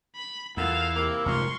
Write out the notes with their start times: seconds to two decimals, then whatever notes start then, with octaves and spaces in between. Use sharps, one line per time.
0.16 B5
0.57 E2 B3 E4 F4 A4 A#4 F5
0.96 C3 A#3
1.26 F1 G#2 F3 A#4 C6 C#6